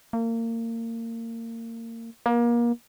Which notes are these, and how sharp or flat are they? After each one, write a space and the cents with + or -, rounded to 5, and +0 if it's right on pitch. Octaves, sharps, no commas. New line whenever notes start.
A#3 -30
A#3 +30